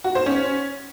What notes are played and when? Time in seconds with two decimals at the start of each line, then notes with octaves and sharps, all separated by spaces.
0.04 F#4
0.15 C5
0.26 C#4